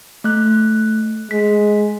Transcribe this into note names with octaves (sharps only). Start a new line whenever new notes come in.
A3 F#6
G#3 B6